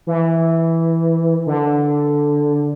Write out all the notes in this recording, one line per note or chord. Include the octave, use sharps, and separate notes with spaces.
E3
D3